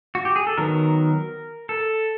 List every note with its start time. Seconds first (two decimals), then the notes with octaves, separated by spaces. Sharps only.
0.15 F#4
0.25 G4
0.36 G#4
0.47 A4
0.58 D#3 F#3 B3 A#4
1.69 A4